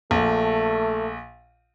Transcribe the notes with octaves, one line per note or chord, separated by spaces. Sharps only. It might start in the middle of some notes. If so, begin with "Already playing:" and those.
A#1 A3